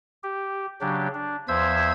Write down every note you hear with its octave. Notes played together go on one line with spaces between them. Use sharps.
G4
C#3 F#3 D4 G4
D4
E2 F3 C5 E5 E6 G#6